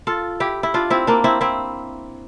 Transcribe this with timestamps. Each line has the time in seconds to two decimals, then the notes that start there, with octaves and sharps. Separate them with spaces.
0.07 F4 A4
0.40 E4 G4
0.63 E4
0.74 D4 F4
0.90 C4 E4
1.07 A#3 D4
1.24 C4 E4
1.41 C4 E4